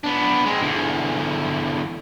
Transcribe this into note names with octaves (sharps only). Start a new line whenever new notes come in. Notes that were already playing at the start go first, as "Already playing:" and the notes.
B3 D4
G#3 C4
E2 D3